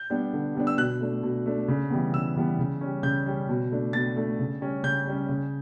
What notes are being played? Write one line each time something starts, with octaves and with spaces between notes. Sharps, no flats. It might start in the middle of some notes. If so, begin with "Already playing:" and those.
Already playing: G6
G3 B3 D4
D3
G3 B3 D4
E6
B2 F#6
A3 D4
B2
A3 D4
C#3
E3 G3 B3
C#3 E6
E3 G3 B3
C#3
G3 C#4
C#3 G6
G3 C#4
B2
A3 D4
B2 A6
A3 D4
C#3
G3 C#4
C#3 G6
G3 C#4
C#3